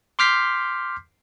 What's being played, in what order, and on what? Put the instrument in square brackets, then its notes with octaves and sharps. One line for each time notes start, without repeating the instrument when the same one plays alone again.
[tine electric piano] C6 D6 F6 G6 B6 C7